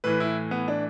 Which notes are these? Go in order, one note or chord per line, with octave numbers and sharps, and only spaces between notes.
A2 E3 B4
E4
B3
D4